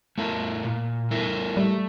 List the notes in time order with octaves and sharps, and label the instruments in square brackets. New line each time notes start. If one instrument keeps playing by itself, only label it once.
[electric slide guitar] A3 E4 A#4
A#2
A3 E4 A#4
[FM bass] G3 [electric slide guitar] A3